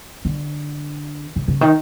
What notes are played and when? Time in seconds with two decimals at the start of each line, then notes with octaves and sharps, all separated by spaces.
0.25 D3
1.36 C#3
1.48 C#3
1.61 D#3